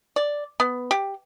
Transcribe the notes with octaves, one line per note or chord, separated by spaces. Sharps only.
D5
B3
G4